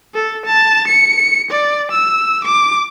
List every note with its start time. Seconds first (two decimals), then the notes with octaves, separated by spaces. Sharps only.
0.15 A4
0.46 A5
0.88 C#7
1.51 D5
1.92 E6
2.45 D6